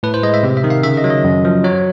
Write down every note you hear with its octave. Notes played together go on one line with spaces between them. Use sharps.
A2 B4
C5
G#3 D#5
E5
C3
E5
D#3
F5
C#3 E5
D#5
F#3
D#5
F#2
F3
F#3 C#5